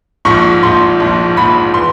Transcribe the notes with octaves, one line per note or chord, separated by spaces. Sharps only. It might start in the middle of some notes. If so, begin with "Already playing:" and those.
A#1 G#2 F3 C#6
A#1 G#2 F3 C6
A#1 G#2 F3
A#1 G#2 F3 B5
E3 C6